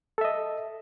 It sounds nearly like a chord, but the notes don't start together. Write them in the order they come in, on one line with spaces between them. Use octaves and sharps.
A4 E5 D#5